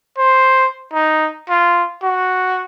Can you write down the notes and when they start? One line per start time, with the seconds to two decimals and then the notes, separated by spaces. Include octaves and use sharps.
0.18 C5
0.93 D#4
1.50 F4
2.03 F#4